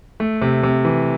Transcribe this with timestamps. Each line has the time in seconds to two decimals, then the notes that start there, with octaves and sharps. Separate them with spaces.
0.20 A3
0.42 C3
0.63 C3
0.85 E3